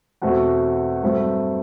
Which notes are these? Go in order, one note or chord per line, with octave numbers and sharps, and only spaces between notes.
E2 B2 A3 C4 F#4
G2 F#3 A3 C4